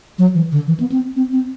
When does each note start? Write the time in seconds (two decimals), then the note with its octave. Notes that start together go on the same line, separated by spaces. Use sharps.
0.19 F#3
0.35 E3
0.52 D3
0.67 E3
0.80 B3
0.92 C4
1.16 C4
1.33 C4